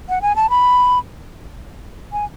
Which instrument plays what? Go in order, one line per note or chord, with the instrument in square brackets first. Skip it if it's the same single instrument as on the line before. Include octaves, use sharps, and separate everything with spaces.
[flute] F#5
G#5
A5
B5
G#5